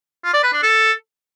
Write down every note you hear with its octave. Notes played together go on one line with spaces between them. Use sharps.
F4
D5
B4
D4
A4